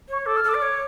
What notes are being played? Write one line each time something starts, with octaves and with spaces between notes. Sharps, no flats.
C#5 C#6
A4 D6
F6
A4 D6
D5
C#5